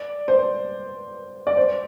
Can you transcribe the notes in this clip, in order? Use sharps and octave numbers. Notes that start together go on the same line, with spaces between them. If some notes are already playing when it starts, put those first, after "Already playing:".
Already playing: D5
C5
D5
C5